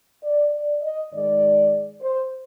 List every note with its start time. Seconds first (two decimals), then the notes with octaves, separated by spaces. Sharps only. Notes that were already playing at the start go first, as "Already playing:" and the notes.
0.23 D5
0.52 D5
0.82 D#5
1.12 G#2 D#3 G#3 D5
2.01 C5